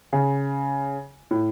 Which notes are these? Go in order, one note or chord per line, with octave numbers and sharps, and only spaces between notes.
C#3
A2